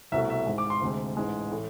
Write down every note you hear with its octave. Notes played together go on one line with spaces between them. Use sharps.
C2 B2 A3 E5
E5
G#1 G#2 G#3
D6
C6
D2 C3 G#3
A1 G#2 G#3
A2 E3 A3